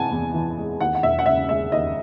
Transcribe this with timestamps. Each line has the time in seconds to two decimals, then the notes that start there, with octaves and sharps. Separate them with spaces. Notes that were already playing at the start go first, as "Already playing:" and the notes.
Already playing: C3 E3 G#3 F#5 G#5 A5
0.11 E2
0.34 E3
0.58 G#3
0.80 D#2 F#5
0.95 F#5
1.03 E1 E5
1.19 F#5
1.26 C#3 E5
1.49 G#3 E5
1.72 D#2 D#5